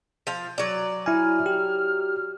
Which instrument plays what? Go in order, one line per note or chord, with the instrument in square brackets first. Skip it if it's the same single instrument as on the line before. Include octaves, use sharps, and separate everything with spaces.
[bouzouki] F3 F5
F#3 D5
[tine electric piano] E4 G#5 [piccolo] F6
[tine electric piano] G4